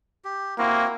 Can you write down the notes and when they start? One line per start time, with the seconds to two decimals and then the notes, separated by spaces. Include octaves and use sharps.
0.24 G4
0.58 A#3 C4 E4 F#4